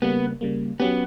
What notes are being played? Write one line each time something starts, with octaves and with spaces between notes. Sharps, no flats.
C#3 G3 A#3 B3
C#3 G3 A#3
F#3 B3 C#4 G4